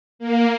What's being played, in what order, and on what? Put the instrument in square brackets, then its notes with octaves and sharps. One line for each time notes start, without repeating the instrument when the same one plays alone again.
[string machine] A#3